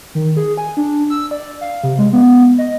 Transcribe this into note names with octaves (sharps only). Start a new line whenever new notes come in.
D#3
G#4
G#5
D4
E6
D5
F5
C3
G#3
B3
D#5